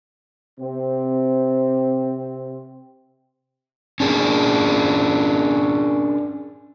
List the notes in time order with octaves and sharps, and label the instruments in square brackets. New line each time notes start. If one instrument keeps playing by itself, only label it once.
[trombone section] C3 C4
[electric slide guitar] C#4 D4 G#4 A#4